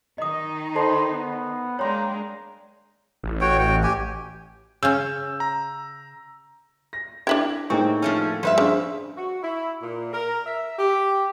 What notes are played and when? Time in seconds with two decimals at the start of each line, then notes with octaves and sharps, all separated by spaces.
0.18 D#3 D#4 D#5 D#6
0.75 A4 C5 G5 A5 B5 C6
1.12 B3
1.79 G#3 A#3 D4 C#5 G5 A#5 C6
3.24 A1
3.41 F#4 C#5 G5
3.59 F#4 G5
3.83 G4 G#5
4.83 C#3 C#4 E6 G6
5.40 A#5
6.93 A#6
7.27 D4 E4 G4 G#6 F#7
7.70 A2 A#3 C4 D#4 G#4 G5 C#6
8.02 F3 A3 C#4
8.43 G2 F3 B4 E5
8.58 C#3 D4 G#4 C5
9.17 F#4
9.42 E4
9.82 A#2
10.12 A#4
10.46 E5
10.78 G4